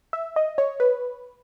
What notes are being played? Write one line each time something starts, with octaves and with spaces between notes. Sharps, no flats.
E5
D#5
C#5
B4